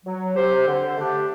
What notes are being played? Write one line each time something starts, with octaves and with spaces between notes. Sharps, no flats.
F#3
C4 G4 C5
D3
A3 D4 G4